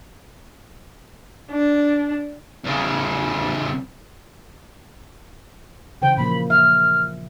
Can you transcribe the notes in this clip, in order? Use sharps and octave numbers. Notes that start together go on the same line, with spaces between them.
D4
E2 C#3
C#3 E3 C5 G5
A#2 F3 A#3 B5
E5 F6